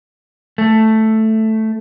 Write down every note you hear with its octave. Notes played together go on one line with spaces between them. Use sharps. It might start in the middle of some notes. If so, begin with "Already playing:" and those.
A3